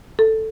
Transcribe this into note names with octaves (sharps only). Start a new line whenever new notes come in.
A4